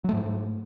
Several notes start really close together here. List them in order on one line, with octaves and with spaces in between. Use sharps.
F#3 A3 G#2